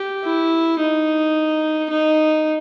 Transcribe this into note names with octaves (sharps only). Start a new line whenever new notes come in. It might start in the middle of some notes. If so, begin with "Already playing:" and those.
Already playing: G4
E4
D#4
D#4